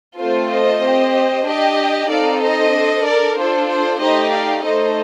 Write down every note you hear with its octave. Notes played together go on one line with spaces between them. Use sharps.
A3 C4 F4 A4 C5
C5 D#5
C4 G4
D4 G4 D#5 G5
C4 D#4 A4 D5 F5
C5 D#5
D4 A4
A#4 D5
D4 F4 A4 C5
C5
A3 D#4 G4 C5 D#5
D5 F5
A3 D#4 A4 C5 D#5